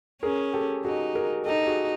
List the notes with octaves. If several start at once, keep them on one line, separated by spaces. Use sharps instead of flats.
C#4 G#4 A#4
G4 A4
D#4 F#4 G#4
G#4 A#4
D#4 G4 A4
F#4 G#4